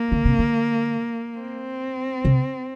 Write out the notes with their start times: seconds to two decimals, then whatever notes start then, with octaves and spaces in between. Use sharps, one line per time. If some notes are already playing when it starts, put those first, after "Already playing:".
Already playing: A#3
0.12 D3
0.25 C3
0.39 D3
1.39 C4
2.25 C3